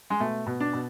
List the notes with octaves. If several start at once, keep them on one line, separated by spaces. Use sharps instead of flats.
G#3
B2 A3
B2
D4
B2